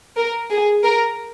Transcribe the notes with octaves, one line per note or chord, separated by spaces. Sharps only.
A#4
G#4
A#4